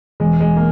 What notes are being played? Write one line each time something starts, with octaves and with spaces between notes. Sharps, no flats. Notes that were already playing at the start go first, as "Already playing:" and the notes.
E1 G#3
G#3
A#3